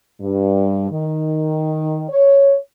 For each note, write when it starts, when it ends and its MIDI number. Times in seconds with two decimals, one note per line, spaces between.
0.21 0.88 43
0.91 2.04 51
2.10 2.56 73